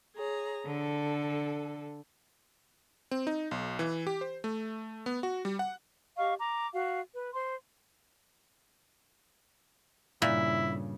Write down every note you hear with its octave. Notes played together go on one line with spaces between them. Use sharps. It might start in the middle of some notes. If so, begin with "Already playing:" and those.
G#4 C#5 A#5
D3 A4
C4
D#4
B1
E3
G4
C5
A3
B3
F#4
G3
F#5
G4 D#5 F5 C#6
A#5 D6
F#4 F5
B4
C5 C6
G2 A#2 C#3 E4